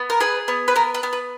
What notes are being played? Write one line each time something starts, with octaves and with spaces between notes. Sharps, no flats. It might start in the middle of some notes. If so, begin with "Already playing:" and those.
Already playing: B3
A#4
G#4 B4
B3
B4
B3 A#4
B4
B3
B4